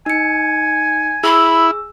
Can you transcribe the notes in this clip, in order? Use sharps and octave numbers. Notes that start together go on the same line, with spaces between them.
D#4 G#5 C#7
E4 G#4 B5 E6